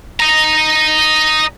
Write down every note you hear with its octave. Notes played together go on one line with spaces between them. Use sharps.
D#5 A#5